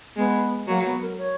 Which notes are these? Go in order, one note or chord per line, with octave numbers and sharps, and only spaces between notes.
G#3 B3
F#3 A#3
B3
A#4
C#5